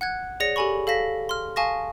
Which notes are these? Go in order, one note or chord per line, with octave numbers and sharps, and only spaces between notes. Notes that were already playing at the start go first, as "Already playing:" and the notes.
F#5 F#6 G#6
G#4 C#5 D5 A#6 C#7
G4 A4 G#5 B5 C#6
A4 F5 A5 A#6 B6
C6 F6
F5 G#5 A5 C#6 D#6 A#6